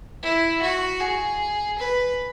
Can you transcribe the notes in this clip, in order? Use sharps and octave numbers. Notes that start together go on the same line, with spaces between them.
E4
F#4
G#4
B4